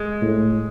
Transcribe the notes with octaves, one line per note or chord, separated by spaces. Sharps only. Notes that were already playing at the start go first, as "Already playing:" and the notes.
Already playing: G#3
A2